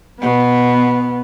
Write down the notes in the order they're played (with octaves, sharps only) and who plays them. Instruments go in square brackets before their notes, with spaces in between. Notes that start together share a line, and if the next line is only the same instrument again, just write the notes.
[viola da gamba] B2 [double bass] B3